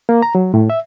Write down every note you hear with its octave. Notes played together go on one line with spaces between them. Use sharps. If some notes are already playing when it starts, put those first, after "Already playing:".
A#3
A#5
F#3
A2
E5